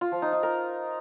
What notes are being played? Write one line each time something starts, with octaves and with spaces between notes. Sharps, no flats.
F4
F3
D#4
D#4
A#4